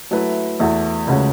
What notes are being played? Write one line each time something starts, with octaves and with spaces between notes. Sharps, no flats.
F#3 A3 E4 B4
E2 E3 A3 F#4
C#2 C#3 A3 C#4 F#4